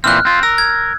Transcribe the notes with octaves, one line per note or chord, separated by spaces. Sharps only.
A#2 E3 C4 F6 F#6
C4 F4
A#4 E6
G#6